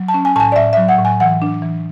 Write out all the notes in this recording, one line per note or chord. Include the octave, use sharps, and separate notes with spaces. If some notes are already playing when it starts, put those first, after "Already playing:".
Already playing: F#3
A5
C#4
G#5
A2 G#5 A5
D5
A2 E5
F#3 E5
F#5
A2
G#5
E3 F#5
D4
E3